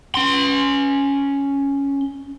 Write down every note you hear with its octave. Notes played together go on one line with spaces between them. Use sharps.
C#4 C6